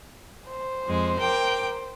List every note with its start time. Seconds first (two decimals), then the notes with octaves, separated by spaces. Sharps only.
0.49 C5
0.86 F2 G#3
1.18 A#4 G5 D6